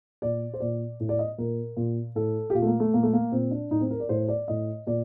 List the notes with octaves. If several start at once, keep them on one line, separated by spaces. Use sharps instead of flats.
A#2 D5
C5
A#2 D5
A2
D5
D#5
A#2 A#4
A#2
A2 A4
G4
A#2 F4
A3
A#3
A3
A#2 A#3
A3
A#3
A#2 C4
D4
A2 D#4
C4
A#4
D5
A2 C5
D5
A2 D#5
A#2 D5